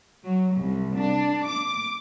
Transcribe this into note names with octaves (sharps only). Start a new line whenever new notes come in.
F#3
C2
D4
D6